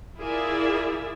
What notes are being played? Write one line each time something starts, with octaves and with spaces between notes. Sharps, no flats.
E4 F4 G#4 A#4 D5 E5